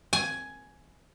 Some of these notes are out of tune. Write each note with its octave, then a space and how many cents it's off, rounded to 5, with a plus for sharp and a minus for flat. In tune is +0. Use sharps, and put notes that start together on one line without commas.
G#5 +10